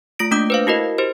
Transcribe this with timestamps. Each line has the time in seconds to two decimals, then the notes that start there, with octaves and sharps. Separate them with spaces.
0.19 A3 F4 A#6 D7
0.31 A3 A#3 D4 D6 D#6 G6
0.50 B4 C5 F5
0.67 E4 F#4 A#4 D#5
0.98 G4 C5